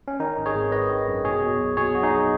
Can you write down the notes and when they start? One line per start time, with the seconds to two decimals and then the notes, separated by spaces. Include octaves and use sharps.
0.08 C#4
0.20 D#3 D#4
0.37 G#1
0.46 G#4 C#5
0.55 G#1
0.72 D#3 B4 D#5
0.90 D#3
1.08 F#2
1.25 B2 G#4 C#5
1.42 B2
1.60 B1
1.77 B2 G#4 C#5
1.95 B1 F#4
2.03 D#4 G#4
2.12 B1